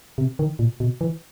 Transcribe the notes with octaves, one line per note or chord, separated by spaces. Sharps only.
C3
D#3
A#2
B2
E3